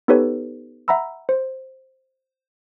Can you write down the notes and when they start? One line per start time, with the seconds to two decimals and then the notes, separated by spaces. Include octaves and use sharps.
0.08 B3 D#4 G4 A4 B4 C#5
0.88 E5 F#5 A#5 B5 E6
1.29 C5